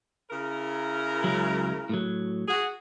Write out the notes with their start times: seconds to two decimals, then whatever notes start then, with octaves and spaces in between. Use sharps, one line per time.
0.31 C#3 E4 A#4
1.24 C#2 F#3
1.89 A2 F#3
2.48 F#4 G#4